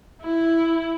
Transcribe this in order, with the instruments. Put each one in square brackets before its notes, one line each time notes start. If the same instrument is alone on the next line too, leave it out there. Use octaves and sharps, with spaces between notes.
[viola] E4